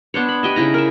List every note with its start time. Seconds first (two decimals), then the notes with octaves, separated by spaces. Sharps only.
0.14 B3 D4 C5 C#5
0.29 B5
0.43 G4 D#5 E5
0.56 C#3 D#4 E4 A#5
0.74 A#4 E5